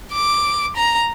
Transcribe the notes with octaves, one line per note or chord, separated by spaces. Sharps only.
D6
A#5